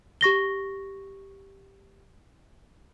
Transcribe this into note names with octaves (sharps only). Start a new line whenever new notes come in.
G4 C#6 A#6 G7